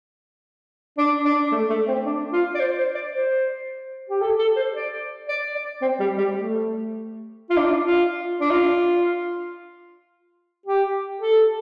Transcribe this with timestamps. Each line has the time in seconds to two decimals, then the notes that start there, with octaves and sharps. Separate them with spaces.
0.98 D4
1.25 D4
1.52 A3
1.70 A3
1.88 C4
2.06 D4
2.32 F4
2.55 D5
2.59 C5
2.78 C5
2.95 D5
3.13 C5
4.10 G4
4.21 A4
4.39 A4
4.56 C5
4.74 D5
5.28 D5
5.55 D5
5.82 C4
6.00 G3
6.18 G3
6.36 A3
7.50 F4
7.57 D4
7.65 F4
7.71 D4
7.84 F4
8.41 D4
8.50 F4
10.66 G4
11.20 A4